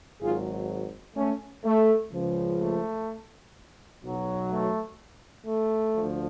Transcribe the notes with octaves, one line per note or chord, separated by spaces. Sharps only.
G#1 G#2 F#3 F4 G#4
A3 C#4
A3
C#2 C#3 F3
A3
B1 B2 F#3
A3
A3
D2 D3 F3